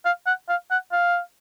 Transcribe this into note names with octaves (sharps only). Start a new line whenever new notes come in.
F5
F#5
F5
F#5
F5